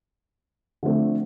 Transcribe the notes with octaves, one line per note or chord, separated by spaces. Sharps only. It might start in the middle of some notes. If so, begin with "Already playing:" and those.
D3 F3 A3 C4